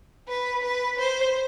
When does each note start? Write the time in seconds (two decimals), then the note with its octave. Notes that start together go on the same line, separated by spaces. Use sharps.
0.28 B4
0.63 B4
0.98 C5